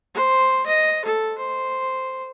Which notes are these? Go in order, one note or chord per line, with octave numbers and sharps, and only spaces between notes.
C5
D#5
A4
C5